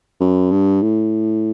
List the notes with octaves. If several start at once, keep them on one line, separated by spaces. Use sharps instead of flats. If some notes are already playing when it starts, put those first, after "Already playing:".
F#2
G2
A2